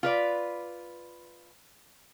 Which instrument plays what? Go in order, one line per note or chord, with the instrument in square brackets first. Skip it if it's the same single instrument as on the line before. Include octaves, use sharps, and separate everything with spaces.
[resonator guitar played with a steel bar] F4 B4 D5